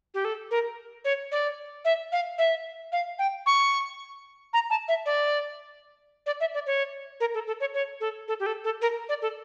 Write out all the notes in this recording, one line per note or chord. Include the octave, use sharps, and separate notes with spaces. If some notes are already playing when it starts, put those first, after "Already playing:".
G4
A4
A#4
C#5
D5
E5
F5
E5
F5
G5
C#6
A#5
A5
E5
D5
D5
E5
D5
C#5
A#4
A4
A4
C#5
C#5
A4
A4
G4
A4
A4
A#4
D5
A4